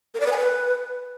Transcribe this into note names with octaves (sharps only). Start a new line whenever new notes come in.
A#4
D5
B4
G#5
B4